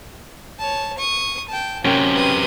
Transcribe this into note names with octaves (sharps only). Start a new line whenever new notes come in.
C#5 A5
C#6 D#6
G5 A5
F#2 C3 A#3 C#4 G5
B4 D#6